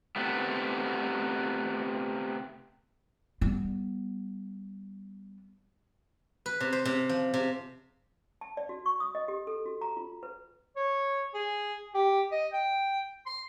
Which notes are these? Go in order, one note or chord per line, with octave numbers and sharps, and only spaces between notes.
C3 A3 B3
G3 B3
B4
C3
C5
C3
F3
C3
A5
D5
F#4
C#6
D#6
D#5
G4
A4
F#4
A#5
F4
B4
C#5
G#4
G4
D#5
G5
C6